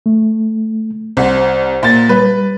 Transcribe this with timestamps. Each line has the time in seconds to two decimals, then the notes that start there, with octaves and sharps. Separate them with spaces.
0.06 A3
1.17 C2 C5 F#5
1.83 A#2 A6
2.09 G3 B4